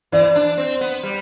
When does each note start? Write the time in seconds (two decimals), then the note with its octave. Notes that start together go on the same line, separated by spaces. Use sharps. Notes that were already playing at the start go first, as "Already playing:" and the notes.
0.12 E3 D5
0.35 D4
0.58 C4
0.81 B3
1.03 G3